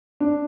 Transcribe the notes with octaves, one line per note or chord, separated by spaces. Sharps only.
D4